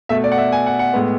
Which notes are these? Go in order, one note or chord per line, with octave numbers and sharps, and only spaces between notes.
B2 A3 E5
D5
F#5
E5
G#5
F#5
F#5
A2 G#3 B3